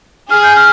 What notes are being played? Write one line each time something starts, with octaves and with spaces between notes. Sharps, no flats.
G#4 F6
G6
F6